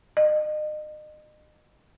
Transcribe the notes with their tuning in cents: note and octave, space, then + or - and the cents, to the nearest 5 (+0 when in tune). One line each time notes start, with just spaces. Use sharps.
D#5 -35